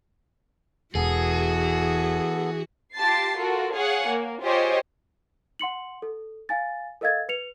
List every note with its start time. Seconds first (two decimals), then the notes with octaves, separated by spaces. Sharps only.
0.95 E1 E3 B3 F#4 G#4 A4
2.95 F4 G4 A5 A6 C7
3.37 F4 F#4 A4 A#4
3.74 G#4 C#5 F5 F#5 G#5
4.09 A#3
4.41 F4 G4 G#4 C5 C#5 D#5
5.59 F#5 C6 C#7 F#7
6.02 A4
6.49 F5 G#5 A6
7.01 A4 A#4 D#5 F5 G#6 A6
7.29 B4 C#7 F7